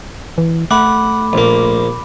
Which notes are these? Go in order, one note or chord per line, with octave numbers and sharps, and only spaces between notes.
E3
A3 F#5 B5 D6
A#1 A#3